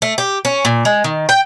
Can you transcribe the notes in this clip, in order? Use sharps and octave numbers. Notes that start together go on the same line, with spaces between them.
A3
G4
C#4
A#2
G#3
D#3
G5